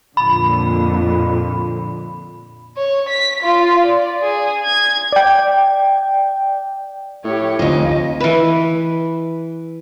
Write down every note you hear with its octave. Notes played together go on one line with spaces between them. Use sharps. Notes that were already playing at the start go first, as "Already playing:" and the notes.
F2 A#2 D3 B5
C#5
B6
F4
D5
G#4
G#6
D5 G5
A2 G4 C#5
F1 D2 F4 D#5
E3 B4